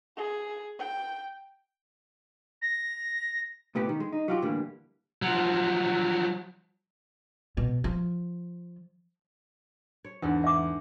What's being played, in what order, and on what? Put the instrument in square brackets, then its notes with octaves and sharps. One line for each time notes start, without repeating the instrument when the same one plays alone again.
[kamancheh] G#4
G5
[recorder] A#6
[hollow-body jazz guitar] C#2 A2 B3 G4
D#3
G#3
D#4
F#3 F4 G4
A2 D3 E3 G3 A#3
[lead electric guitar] F3 F#3
[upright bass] B2
F3
[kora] C#5
[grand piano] E2 [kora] G#2 D3
[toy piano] E5 D6